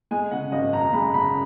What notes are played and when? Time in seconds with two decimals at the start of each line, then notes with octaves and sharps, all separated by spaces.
0.11 G#3 G#5
0.31 C#3 F#5
0.52 G#1 D#5
0.73 F#2 A#5
0.93 G#3 B5
1.14 C#3 B5